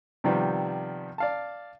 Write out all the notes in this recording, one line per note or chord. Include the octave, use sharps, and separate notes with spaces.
C3 D#3 F3 G3 B3
D5 F5 A5